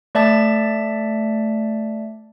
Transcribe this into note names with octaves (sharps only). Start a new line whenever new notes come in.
A3 D5 E5 A5 A6